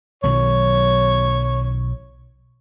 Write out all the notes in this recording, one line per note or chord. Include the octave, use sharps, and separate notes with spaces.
B1 D#3 F#3 C#5